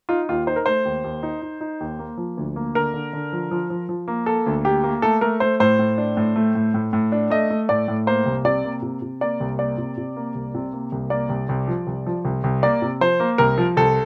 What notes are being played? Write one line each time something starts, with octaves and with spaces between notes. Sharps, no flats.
D#4 F4
D#2 F4
D#4 C5
A#4
A3 C5
D#2
D#2
D#4
D#4
D#4
D#2
A#3
F3
D2
A#3
D3 A#4
D3
D3
F3
F3
F3
F3
A#3
A#3 A4
D2
A#3 G4
A#3
A3 A4
A3 A#4
A3 C5
A2 C5
A2
D4
A2
A3
A2
A2
A2
D4
A3 D#5
A3
A2 D5
A2
A#3 C5
C2
C3 D5
A#3
C3
C3
A#3 D5
C2
A#3 D5
C3
C3
A#3
C2
C3
A#3
C2
A#3 D5
C2
C2
F3
C2
F3
C2
C2
A#3 D5
C3
F3 C5
A#3
C2 A#4
F3
C2 A4